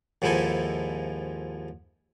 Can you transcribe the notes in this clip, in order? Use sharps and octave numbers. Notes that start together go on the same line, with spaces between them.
D#2 G#2 F3 E4 A4 G#5